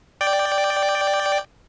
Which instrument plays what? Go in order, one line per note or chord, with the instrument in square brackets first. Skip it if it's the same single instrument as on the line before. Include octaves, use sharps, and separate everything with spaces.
[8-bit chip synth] D5 G5